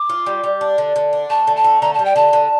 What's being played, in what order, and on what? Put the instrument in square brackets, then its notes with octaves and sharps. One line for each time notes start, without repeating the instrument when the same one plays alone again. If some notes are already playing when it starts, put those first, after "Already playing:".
Already playing: [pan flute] D6
[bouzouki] F4
G3
G3
D4
D3
D3
D4
[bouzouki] A3 [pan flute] A5
[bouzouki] D3
[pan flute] A5
[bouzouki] A3
[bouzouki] D3 [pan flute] A#5
[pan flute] A5
[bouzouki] G3
[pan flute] G5
[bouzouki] D3 [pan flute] A5
[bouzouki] D3